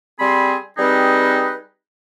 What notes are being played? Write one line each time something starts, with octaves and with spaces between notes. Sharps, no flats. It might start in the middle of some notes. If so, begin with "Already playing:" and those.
G3 C4 G#4 B5 C6
G3 C4 D#4 G#4 B4